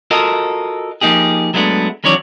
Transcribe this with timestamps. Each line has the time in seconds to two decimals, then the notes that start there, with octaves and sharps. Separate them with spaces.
0.11 F4 F#4 A4 A#4 D#5
1.01 F3 A#3 D#4 G4 G#4
1.54 F#3 G#3 A3 B3 D4
2.04 D#3 E3 F#3 C#4 C#5 D5